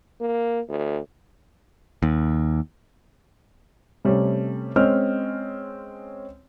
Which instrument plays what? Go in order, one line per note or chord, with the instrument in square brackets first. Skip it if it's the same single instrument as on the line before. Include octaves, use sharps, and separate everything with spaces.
[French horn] A#3
D2
[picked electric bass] D#2
[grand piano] C3 G3 A3 C#4
G#3 C4 C#4 D#5 F6